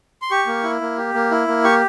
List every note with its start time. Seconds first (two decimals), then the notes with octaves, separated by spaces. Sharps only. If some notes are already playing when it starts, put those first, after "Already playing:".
0.22 C6
0.31 G4 C#6
0.47 A#3
0.64 E4
0.81 A#3
0.98 G4
1.14 A#3
1.31 E4
1.48 A#3
1.64 G4 C#6